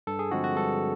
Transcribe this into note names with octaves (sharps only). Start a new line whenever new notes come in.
G2 A4
G#4
D3 F3 G#3 C4 F#4
F#4
G2 A4